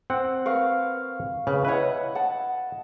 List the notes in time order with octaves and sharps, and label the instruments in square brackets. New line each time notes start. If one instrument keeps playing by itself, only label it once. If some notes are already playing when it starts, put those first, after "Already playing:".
[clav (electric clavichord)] C4 F#5
[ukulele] A#4 B4 [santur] F5 C#6
[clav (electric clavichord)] C#3 [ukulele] B4
[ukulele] E4 C#5 [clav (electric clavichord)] B4 [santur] D#5 E5 F#5
[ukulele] F#5 [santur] A5